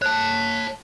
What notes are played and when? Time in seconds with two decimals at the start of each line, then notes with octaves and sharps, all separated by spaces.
0.02 C#5 A5 F#6